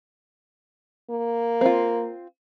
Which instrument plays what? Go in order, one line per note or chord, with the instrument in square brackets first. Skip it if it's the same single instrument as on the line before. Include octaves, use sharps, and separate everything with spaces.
[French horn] A#3
[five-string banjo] C4 F4